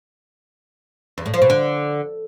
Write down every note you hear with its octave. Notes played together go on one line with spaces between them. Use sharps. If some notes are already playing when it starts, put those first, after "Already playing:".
E2
A2
F3
B2
D3